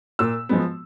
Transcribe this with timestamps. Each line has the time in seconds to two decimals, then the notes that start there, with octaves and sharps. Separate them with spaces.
0.19 A#2 E6
0.49 F3 G#3 B3